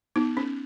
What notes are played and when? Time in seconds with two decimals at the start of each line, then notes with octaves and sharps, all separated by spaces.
0.16 B3 D#4
0.37 C#4